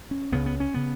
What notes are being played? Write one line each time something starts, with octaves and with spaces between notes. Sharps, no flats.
C#4
C#2 C#3 B3
B3
C#4
C#3 B3